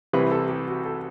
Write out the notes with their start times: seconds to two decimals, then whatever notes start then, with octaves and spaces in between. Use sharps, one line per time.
0.13 C2 C3 E3 G3 B4
0.31 A4
0.50 G4
0.67 F#4
0.85 A4